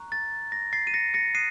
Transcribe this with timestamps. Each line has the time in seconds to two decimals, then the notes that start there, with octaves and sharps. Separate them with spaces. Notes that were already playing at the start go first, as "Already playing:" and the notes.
Already playing: A#5 C#6 F#6
0.12 A6
0.52 A#6
0.73 A6 C7
0.87 D#7
0.94 A#6 C#7
1.14 A#6 C#7
1.34 D#6 F#6 C7 D#7